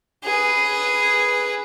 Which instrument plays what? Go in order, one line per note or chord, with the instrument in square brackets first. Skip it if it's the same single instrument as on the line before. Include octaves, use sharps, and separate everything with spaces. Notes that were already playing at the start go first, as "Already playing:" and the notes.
[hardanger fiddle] G#4 B4